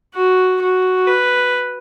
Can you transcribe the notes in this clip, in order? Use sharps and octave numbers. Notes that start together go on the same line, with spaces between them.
F#4
F#4
B4